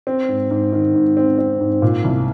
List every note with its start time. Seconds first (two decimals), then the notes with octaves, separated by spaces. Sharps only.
0.07 C4
0.29 G#2
0.51 G#2
0.73 D#3
0.95 G#2
1.17 C4
1.38 C4
1.61 G#2
1.82 A#2
2.04 C2